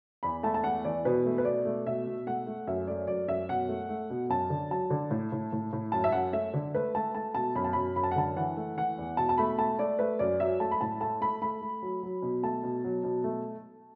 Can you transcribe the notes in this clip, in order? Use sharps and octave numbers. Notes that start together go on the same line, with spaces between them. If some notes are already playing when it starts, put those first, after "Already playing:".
E2 B5
A3 A5
A5
E2 F#5
E3 D5
B2 B4
A3
B4
B2 D5
A3
B2 E5
B2
A3 F#5
A3
F#2 E5
A3 D5
F#2 D5
F#2 E5
B2 F#5
A3
A3
B2
F#2 A5
D3
F#3 A5
D3
A2
A2
A2
A2
F#2 A5
E5
F#2 F#5
A3 E5
D3
A3 B4
A3 A5
A3 A5
B2 A5
F#2 B5
A5
F#2 B5
F#2 B5
A5
F#5
D3 A5
E3 F#5
A3
E3 F#5
E2
B2 A5
A5
A3 B5
A3 A5
A3 D5
A3 B4
F#2 D5
F#3 E5
A3 A5
B5
A2 A5
A3 A5
A3 B5
A3 B5
A3
F#3
F#3
B2
A3 A5
B2
F#3
B2
A3